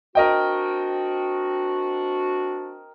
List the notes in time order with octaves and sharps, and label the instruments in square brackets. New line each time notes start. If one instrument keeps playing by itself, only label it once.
[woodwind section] C4 D4 F#4 [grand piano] A#4 D#5 G5